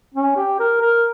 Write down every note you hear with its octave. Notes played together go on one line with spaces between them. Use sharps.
C#4
G4
A#4
A#4